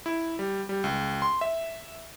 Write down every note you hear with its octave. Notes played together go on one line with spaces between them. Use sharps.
E4
G3
G3
C#2
C6
E5